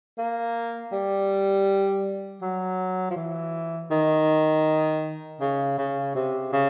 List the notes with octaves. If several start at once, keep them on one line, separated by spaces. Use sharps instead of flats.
A#3
G3
F#3
F3
E3
D#3
C#3
C#3
C3
C#3